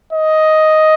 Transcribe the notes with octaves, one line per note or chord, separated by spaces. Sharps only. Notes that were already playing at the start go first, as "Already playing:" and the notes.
D#5